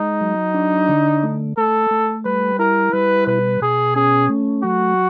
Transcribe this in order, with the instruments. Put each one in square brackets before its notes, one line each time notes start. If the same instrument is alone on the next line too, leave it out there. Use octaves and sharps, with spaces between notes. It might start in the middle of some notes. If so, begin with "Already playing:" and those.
Already playing: [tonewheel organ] G#3 [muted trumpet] D#4
[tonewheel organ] F#3
D4
D3
A3
[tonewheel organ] A3 [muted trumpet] A4
[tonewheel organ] A3
[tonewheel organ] G3 [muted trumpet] B4
[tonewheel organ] E4 [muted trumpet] A#4
[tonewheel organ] G3 [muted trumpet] B4
[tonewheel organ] B2 [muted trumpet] B4
[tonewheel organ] B2 [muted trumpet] G#4
[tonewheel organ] C#4 [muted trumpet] G#4
[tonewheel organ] A3
[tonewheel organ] F#3 [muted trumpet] F#4